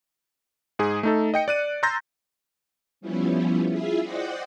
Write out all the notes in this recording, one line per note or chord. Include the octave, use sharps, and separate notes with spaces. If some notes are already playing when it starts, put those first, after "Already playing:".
G#2 G#4
A3 D#4 A4
D#5 G5 C#7
D5 F#6 D#7
A#5 C6 E6 G6 A6 A#6
F3 G3 B3 C#4 E4
E4 F4 G#4 E5
C5 D5 D#5 F#5 G5 C6